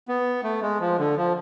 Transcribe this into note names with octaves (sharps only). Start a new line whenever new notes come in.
B3
A3
G#3
F3
D3
F3